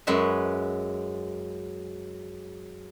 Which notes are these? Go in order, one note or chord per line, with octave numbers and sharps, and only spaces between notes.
F#2 G#3 B4 E5